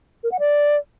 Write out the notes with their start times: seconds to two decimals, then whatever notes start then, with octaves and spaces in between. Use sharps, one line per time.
0.23 A#4
0.31 F#5
0.40 D5